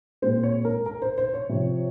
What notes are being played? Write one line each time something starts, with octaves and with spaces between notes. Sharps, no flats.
A#2 G#3 C4 C5
C#5
A#4
A#4
C5
C5
C#5
C3 F3 C4